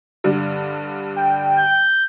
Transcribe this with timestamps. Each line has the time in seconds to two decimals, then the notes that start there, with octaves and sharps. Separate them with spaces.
0.24 G2 D3 G3
1.16 G5
1.59 G6